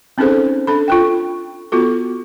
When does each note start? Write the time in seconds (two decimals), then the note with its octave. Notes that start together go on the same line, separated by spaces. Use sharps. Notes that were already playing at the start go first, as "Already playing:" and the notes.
0.18 C4 C#4 D#4 G#4 A4 C5
0.67 D4 A4 B5
0.88 F4 A4 G5
1.72 B3 F4 F#4 A4